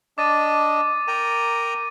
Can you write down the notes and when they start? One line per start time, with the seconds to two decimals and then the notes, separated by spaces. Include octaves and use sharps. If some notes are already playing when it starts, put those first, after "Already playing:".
0.18 D4 D#5 D6 A6 D#7
1.08 A#4 G5 A#5 D#7